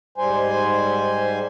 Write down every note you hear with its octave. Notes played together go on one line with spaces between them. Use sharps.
G#2 G3 C5 G#5